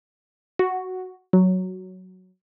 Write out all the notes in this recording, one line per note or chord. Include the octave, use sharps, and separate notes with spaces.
F#4
F#3